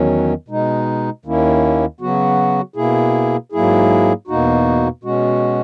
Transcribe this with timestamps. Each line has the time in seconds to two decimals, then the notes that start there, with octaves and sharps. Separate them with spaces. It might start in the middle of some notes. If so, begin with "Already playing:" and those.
Already playing: E2 D#3 F#3 C#4
0.48 B2 G#3 D#4
1.25 D#2 D#3 A#3 C#4 E4
2.00 C#3 F#3 B3 F#4
2.76 B2 A#3 E4 G#4
3.52 G#2 F#3 A#3 E4 G#4
4.28 E2 B2 A#3 D#4 F#4
5.04 B2 G#3 C#4 F#4